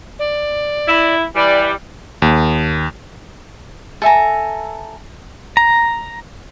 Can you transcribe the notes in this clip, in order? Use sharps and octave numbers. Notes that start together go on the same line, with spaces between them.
D5
E4
E3 G3 D5
D#2
A4 E5 G#5 A#5
A#5